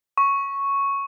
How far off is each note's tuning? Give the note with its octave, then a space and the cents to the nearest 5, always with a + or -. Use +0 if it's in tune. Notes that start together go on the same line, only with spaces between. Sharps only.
C#6 +0